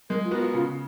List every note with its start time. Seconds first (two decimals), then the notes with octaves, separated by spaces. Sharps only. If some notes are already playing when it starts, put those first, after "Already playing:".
0.09 G#3 A#4
0.24 F4
0.31 B3 F#4 A#4
0.39 F4
0.53 C#3 F4